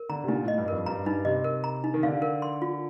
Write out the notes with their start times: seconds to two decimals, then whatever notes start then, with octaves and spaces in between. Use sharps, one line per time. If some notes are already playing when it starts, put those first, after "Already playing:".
Already playing: A#4
0.09 D3 A#5
0.24 C3
0.28 A#2 D#4
0.43 A2 D#5
0.58 G2
0.68 F2 A#4
0.86 G2 A#5
1.06 G2 D#4
1.25 C3 D#5
1.44 A#4
1.64 A#5
1.84 D#4
1.94 D#3
2.03 D3 F5
2.22 A#4
2.42 C6
2.62 F4